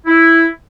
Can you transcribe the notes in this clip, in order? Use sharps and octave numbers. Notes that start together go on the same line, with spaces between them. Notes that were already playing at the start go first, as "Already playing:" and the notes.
E4